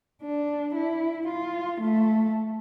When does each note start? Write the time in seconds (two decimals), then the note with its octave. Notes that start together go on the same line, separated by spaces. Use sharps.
0.22 D4
0.75 E4
1.28 F4
1.82 A3